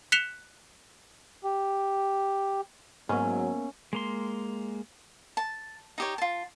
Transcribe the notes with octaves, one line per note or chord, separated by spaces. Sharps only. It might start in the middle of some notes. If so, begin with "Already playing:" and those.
F#6 B6 C#7 E7 F7 G7
G4
G#2 F#3 A#3 B3 C#4 A#4
G#3 A#3 C6
A5
D#4 G4 C#5
F4 A5